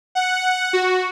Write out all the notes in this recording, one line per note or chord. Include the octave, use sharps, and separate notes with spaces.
F#5
F#4